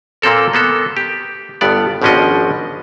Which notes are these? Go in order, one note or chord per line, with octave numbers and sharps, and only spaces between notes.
A#2 A#3 C4 A4 A#4
A#3 B3 A4
G4
G1 G2 B3 D5
G#1 B2 F3 C#4 D4 D#5